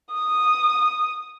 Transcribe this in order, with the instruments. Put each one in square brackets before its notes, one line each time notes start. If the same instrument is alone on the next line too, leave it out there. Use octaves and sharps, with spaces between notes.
[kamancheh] D#6